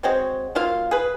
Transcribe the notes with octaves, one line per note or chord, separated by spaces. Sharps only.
G#3 C4 F#4 C#5
F#3 A#3 F4 F5
G#4 B4